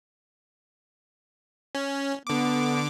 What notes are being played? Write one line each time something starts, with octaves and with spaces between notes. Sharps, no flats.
C#4
D3 B3 D6